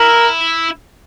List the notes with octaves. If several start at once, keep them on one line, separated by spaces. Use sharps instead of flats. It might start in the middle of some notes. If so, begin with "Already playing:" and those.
Already playing: E4 A#4